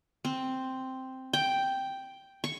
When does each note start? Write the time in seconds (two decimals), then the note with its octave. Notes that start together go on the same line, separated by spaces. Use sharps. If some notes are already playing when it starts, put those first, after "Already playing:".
0.25 C4
1.33 G5
2.44 C#6